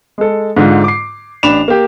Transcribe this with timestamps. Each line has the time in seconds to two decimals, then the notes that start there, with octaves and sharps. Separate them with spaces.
0.18 G#3 A4
0.57 G#2 D3 D4 F4
0.84 D6 C7
1.43 A1 D4 B5 E7 F7
1.68 A#3 G4